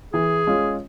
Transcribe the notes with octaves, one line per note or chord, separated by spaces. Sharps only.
E3 G#4
G#3 C#4 F4